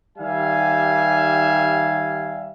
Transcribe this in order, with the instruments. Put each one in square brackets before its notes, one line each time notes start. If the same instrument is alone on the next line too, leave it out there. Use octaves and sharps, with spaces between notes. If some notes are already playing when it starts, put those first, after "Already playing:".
[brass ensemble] D#3 G3 G4 E5 F5 G#5